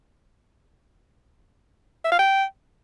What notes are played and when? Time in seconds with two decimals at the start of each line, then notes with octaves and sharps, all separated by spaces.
2.04 E5
2.12 F5
2.19 G5